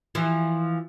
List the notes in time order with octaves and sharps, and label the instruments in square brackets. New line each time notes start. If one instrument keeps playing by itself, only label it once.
[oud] E3 F3